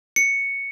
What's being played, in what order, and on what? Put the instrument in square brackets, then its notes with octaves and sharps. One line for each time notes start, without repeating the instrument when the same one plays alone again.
[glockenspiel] C#7